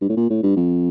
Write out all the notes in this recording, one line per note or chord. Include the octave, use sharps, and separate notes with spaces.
G2
A2
A#2
A2
G2
F2